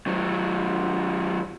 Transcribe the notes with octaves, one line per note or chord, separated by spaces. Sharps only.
D#3 F#3